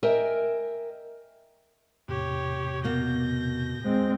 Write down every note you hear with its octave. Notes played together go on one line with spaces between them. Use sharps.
A#4 D#5 E5 G5 G#5
E2 A2 C3 G4 C#5
B2 A#3 G6 A#6
G#3 C4